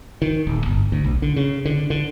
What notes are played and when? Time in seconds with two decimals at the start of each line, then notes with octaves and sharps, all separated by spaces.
0.22 D#3
0.47 D1
0.66 G1
0.92 D2
1.04 B1
1.22 D3
1.36 C#3
1.65 D3
1.90 D3